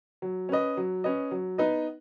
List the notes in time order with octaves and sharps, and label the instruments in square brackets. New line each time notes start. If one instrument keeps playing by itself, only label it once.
[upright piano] F#3
C#4 B4 D#5
F#3
C#4 B4 D#5
F#3
B3 D#4 B4 D#5